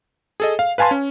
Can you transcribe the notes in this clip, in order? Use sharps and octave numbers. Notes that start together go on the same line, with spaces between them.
G#4 A4 D#5
F5
B4 F5 G#5 A5 C6
C#4